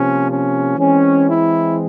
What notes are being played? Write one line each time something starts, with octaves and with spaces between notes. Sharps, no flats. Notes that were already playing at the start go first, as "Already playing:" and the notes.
Already playing: C3 F3 A#3 C#4
C#4
E3 G#3 C4 C#4
E4